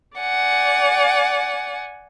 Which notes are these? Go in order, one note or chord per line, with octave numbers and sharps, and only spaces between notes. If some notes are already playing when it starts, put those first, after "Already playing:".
D5 F#5 G#5